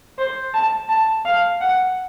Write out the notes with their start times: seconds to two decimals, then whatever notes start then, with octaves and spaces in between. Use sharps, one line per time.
0.18 C5
0.54 A5
0.89 A5
1.25 F5
1.61 F#5